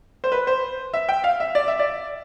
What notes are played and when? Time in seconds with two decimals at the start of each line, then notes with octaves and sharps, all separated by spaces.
0.24 C5
0.32 B4
0.47 C5
0.94 E5
1.09 G5
1.24 F5
1.40 E5
1.55 D5
1.68 E5
1.79 D5